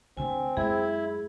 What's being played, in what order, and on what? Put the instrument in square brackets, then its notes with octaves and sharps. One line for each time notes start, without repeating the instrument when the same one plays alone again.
[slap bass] D2 D3 A3 [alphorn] C4 [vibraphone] G#5
[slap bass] F#2 G#3 A3 [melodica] E4 [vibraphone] G#4